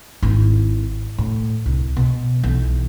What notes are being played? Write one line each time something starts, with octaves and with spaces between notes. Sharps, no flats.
G#1 E4
A2
C2
B2
B1 E3